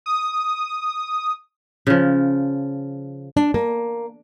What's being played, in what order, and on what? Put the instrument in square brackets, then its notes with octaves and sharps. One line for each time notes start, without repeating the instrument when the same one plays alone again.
[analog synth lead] D#6
[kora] C#3 F3
[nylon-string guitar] D4
A#3